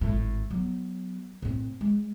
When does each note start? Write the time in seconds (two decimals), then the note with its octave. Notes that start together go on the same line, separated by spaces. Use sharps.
0.01 G#1 A2
0.51 F#3 B3
1.42 A2 C4
1.81 G#3